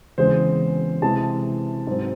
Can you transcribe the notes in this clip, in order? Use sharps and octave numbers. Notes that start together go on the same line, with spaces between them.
E2 C#3 G#3 C4 C5
C3 E3 G#3 C4 A5
G#2 F#3 C4